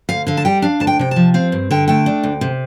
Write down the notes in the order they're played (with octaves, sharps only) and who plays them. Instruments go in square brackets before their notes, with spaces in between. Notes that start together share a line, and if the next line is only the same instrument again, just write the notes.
[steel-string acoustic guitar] D2 F5
D3 F5
A5
G3 G5
D4 F5
D2 A5
G5
C3 G5
F3 A5
C4 F5
G2
D3 G5
A3 G5
D4
D2
C3